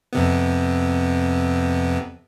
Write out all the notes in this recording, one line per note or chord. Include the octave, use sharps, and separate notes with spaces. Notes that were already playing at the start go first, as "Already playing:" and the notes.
F2 C3 B3